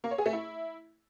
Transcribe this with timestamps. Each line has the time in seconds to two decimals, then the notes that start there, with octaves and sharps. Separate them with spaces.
0.04 A#3
0.11 C#5
0.18 G#4
0.26 A3
0.33 E4